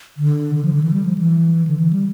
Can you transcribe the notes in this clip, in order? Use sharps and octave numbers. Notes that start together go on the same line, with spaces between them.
D3
D3
F3
D3
E3
G3
F3
E3
D3
E3
G3